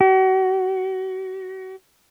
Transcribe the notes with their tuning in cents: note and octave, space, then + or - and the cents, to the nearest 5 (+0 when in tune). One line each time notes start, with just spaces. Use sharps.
F#4 +35